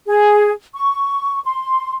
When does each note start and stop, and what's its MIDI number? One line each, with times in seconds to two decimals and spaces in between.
0.07 0.50 68
0.74 1.40 85
1.44 1.93 84